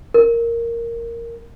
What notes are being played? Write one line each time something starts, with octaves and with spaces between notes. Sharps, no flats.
A#4